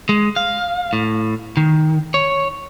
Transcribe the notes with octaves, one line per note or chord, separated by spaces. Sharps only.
G#3
F5
A2
D#3
C#5